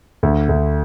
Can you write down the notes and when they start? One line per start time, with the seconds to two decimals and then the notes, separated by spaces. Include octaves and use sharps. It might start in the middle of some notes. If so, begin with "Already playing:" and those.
0.23 D2
0.49 D2